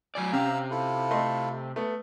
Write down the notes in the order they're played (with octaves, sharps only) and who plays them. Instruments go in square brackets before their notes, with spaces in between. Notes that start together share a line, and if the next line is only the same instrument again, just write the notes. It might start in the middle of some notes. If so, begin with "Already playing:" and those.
[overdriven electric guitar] F#3 D5 [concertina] G#5
[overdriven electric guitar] C3 [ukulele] C#4 G4 [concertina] F5 A#5 E6
[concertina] E4 F4 A4
[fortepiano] A3 C6 [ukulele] D#5
[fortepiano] A3 B3